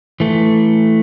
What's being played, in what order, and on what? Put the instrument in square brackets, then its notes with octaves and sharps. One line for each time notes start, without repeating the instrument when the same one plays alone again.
[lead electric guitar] E3 A3